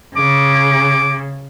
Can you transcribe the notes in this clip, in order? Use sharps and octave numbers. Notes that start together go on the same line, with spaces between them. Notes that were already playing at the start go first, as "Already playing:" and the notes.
C#3 D6